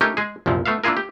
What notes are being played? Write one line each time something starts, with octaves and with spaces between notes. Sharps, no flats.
A3 C#4 D#4 G4 A#4
G#3 G#4
C2 F#2 A#2 F3
A3 B3 E5 F5
A#3 D4 E4 F4 G#4 A#4
G4